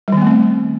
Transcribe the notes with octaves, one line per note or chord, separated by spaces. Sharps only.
D#3 G3 A3 B3 C4